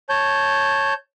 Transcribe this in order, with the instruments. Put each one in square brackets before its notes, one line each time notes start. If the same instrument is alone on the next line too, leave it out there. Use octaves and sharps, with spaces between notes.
[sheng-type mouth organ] C#5 A5 G6